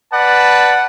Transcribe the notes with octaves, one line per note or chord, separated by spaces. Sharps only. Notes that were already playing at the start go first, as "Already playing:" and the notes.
B4 D5 F#5 A5